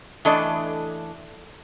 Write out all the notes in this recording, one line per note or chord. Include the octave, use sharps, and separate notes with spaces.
E3 A3 D4 A4 D#5